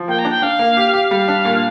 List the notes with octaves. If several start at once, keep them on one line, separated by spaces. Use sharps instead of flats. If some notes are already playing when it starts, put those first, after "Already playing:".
Already playing: F3
A#3 G5
A#5
D4
G5
D4 F5
A#3
G4
G4
G3 F5
D4
A#2